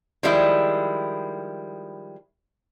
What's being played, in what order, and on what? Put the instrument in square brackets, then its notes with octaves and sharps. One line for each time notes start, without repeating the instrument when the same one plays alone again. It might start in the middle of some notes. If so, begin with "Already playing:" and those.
[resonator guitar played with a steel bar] D#3 F3 G3 G#3 E4